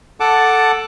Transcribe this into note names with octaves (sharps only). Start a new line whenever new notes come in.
A4 F#5 A5 D6